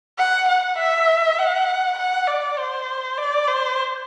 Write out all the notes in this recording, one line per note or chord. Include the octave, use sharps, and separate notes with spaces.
F#5
F#5
E5
F#5
F#5
D5
C5
D5
C5